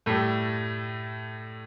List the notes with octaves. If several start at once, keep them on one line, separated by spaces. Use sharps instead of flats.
A2 G3 A3